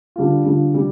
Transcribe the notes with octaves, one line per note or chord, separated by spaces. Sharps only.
D3 G3 F4
D3 G3 F4
C3 G3